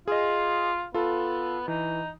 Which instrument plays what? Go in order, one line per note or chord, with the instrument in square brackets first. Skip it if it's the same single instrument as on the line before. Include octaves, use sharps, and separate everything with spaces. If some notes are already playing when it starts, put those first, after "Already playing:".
[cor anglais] F4 [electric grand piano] G#4 D#5
[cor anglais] B3 [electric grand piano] F4 A4
[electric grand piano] E3 [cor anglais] D#4